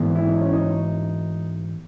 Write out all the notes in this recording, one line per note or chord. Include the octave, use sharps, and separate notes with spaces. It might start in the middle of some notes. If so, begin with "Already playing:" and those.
Already playing: G#2 E3 B3
E4
D#4
C#4
D#4